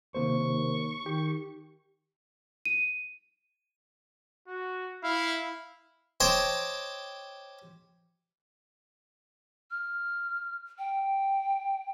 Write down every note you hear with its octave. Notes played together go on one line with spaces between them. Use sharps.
D#2 C3 A#3 C5 C#6
D#3 G4
D#7
F#4
E4 F5
C5 C#5 D#5 G5 A5 D6
F6
G5